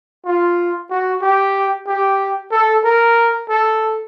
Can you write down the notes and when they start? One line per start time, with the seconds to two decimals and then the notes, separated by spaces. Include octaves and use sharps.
0.25 F4
0.90 F#4
1.22 G4
1.87 G4
2.51 A4
2.84 A#4
3.49 A4